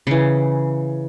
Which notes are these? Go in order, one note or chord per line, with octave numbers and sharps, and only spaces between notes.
C#3 E3